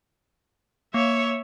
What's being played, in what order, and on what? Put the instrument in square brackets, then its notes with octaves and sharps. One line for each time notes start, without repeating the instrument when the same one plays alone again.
[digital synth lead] A#3 [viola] C#5 E5